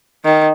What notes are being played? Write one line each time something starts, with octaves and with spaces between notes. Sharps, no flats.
D#3